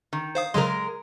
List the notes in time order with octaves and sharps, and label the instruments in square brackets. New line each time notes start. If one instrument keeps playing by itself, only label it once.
[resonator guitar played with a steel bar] D#3
[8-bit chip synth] C5 F5 D#6
[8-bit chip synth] C#3 F#3 C6 [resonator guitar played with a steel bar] G#3 A#4